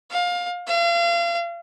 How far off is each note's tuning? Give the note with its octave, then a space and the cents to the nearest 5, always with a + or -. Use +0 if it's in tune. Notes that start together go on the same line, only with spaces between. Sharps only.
F5 +20
F5 -35